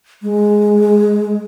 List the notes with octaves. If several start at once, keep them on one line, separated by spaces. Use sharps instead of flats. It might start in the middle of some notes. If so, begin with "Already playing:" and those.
G#3